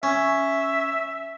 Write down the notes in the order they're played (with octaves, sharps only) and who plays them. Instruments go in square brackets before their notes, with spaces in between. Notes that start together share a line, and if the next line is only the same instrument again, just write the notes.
[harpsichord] C#4 [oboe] E5